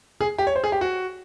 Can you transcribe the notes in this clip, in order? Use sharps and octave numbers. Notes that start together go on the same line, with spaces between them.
G#4
G4
C#5
C5
G#4
G4
F#4